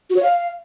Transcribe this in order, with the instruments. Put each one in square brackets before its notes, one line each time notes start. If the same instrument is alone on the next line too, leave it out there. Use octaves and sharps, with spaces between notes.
[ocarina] F#4
C#5
F5